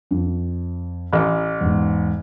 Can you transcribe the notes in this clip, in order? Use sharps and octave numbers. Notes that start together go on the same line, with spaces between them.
F2
A1
E2 G#2